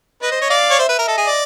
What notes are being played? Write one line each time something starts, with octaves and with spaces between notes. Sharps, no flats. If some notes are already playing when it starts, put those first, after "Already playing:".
B4 D#5
C5
C#5
D5 F5
C#5
C5 E5
B4
A#4
A4 D#5
G#4
D5